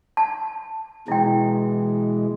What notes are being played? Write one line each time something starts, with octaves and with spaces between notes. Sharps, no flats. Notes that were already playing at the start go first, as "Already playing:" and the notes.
A5
B2 E3 G#3 E4 G5